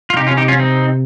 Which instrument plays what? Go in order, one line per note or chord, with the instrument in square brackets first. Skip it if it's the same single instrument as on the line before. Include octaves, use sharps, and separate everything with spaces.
[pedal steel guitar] F4
[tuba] C3 [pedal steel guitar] D#4 G4
[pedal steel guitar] C#4 F4
D#4 G4
C#4 F4
C4 D#4